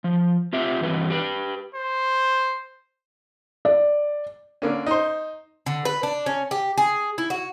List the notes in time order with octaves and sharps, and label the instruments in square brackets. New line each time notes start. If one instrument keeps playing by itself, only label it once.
[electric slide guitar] F3
C4 F4 G4 E5
G2 E3 F#3 C4 B4
G4 B4
[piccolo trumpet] C5
[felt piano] D5
[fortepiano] D3 A#3 C#4
D#4 C5
[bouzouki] D3
B4
D4
C#4
G4
G#4
E4
F#4